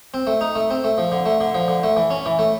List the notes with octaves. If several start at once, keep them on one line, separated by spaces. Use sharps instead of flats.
C4
A3
D#4
A3
C4
A3
F3
D3
A3
D3
F3
D3
A3
E3
C#4
E3
A3